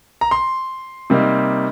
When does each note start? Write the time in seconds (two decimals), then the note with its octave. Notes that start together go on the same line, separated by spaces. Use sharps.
0.21 A#5
0.31 C6
1.10 C3 G3 A#3 D#4